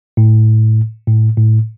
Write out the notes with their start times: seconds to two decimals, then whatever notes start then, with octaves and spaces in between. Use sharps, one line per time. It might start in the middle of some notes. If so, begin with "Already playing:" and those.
0.17 A2
1.07 A2
1.37 A2